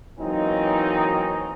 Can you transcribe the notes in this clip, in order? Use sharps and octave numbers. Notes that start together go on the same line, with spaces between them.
E3 F#3 A#3 C4 C#4 D#4